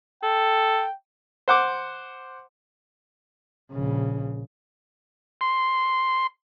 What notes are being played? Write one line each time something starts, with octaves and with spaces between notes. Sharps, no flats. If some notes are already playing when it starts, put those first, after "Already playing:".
A4 G5
C5 F#5 D6
A#1 C#3
C6